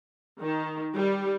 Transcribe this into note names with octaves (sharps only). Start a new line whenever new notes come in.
D#3
G3